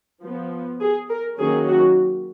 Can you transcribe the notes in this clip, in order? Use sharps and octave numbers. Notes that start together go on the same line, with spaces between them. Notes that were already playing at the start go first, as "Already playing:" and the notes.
F3 B3
G#4
A#4
D#3 F#3 A#3 C#4 G#4
F#4